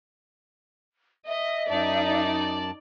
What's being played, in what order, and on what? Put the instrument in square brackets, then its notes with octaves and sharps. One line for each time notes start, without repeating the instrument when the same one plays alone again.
[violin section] D#5 [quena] E5
[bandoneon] F#2 A5 [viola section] D#4 [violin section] D5